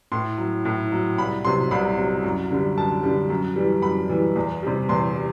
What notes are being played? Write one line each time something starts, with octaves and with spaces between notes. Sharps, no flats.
A2 C6
F#3
A2
F#3
C2 B5
C3 F#3 C6
C2 B5
C3 F#3
F#2
D3 G3
F#2 A5
D3 G3
F#2
E3 G3
F#2 B5
E3 G3
E2
C3 G3
E2 C6
G3